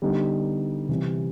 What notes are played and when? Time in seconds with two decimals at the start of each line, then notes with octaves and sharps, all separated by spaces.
0.02 D3 G3 B3 D#4
0.89 C3 E3 G3